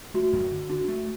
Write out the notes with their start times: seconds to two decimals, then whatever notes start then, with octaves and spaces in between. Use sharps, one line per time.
0.14 A3 F#4
0.33 F#2
0.51 D3
0.69 D4 F#4
0.88 A3